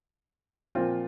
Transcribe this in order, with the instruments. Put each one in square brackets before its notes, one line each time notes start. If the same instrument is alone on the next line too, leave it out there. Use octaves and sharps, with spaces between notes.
[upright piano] A#2 F3 C4 F4